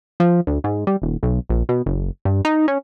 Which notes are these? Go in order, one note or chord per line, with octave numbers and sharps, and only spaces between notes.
F3
D2
G#2
G3
D#1
B1
A#1
B2
F#1
G2
D#4
C#4